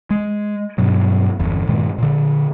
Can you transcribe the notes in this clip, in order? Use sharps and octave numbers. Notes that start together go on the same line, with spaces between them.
G#3
G2 B2 F#3
G1 E2
G2 A#2 D#3 G#3
A#2 D3